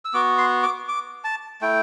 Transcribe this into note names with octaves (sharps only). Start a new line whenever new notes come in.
E6
B3 F#4 D6
C6
D6
D6
A5
A3 E4 G5